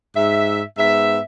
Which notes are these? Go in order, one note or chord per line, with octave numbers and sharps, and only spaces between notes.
G#2 E5
G#2 B3 E5